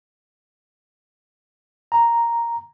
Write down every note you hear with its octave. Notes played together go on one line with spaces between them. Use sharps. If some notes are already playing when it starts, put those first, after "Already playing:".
A#5